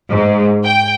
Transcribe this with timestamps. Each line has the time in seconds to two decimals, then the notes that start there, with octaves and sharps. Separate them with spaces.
0.11 G#2
0.64 G5